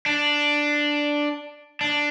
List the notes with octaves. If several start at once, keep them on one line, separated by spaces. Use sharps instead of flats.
D4
D4